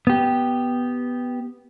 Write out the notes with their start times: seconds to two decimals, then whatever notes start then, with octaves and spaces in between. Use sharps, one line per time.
0.07 B3 G4